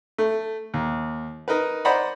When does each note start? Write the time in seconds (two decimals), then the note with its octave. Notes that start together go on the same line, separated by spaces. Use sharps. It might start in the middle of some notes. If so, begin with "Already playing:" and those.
0.18 A3
0.74 D#2
1.48 D#4 A#4 B4
1.85 C5 D5 D#5 F#5 A#5 B5